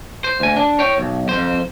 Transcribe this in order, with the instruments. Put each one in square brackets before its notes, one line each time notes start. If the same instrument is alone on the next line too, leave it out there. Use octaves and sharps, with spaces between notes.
[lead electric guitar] C5
D2 G#5
D4
C#5 G5
B1
F2 C5